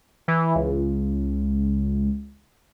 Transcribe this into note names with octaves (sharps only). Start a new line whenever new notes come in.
E3
C#2